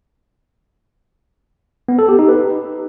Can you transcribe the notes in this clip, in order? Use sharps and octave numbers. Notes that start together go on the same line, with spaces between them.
B3
A4
G4
D#4
B4